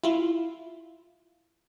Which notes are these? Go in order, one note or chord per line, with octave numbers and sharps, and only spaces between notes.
E4 F4